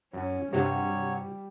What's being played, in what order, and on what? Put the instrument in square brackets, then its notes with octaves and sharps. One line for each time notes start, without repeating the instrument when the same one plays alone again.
[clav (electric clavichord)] F#2 [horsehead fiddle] C#4
[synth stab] G2 C3 [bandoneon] F#3 C#5 [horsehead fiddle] G3 [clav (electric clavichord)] F#4